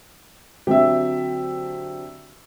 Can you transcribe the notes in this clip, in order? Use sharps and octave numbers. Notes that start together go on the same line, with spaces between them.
D3 F#3 C4 G4 E5